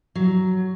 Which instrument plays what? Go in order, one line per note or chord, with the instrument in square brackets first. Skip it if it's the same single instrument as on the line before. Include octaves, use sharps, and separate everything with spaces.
[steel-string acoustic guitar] F#3